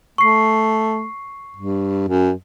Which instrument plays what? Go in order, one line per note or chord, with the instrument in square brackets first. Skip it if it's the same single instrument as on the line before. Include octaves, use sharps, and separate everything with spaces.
[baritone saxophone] A3 [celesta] C#6 C7
[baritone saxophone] G2
F#2